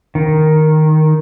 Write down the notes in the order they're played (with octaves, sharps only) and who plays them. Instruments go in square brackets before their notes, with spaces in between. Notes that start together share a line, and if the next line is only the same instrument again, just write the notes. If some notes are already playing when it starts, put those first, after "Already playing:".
[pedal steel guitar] D#3